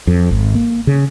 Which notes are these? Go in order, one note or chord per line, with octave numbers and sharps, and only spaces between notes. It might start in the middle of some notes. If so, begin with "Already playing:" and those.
F2
G#1
A#3
C#3